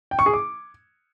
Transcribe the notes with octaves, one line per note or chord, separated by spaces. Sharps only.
G5
C#6
G#4
D6